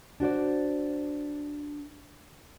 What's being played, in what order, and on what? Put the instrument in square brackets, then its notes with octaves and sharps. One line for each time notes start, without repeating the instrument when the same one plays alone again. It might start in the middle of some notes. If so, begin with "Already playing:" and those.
[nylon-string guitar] D4 F#4 C5 D5